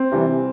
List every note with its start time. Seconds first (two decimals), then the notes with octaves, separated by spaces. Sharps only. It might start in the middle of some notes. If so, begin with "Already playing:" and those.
Already playing: C4
0.12 C3 E3 G3